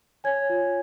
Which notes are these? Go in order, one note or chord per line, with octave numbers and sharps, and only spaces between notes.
C#5 G#5 G#6
F4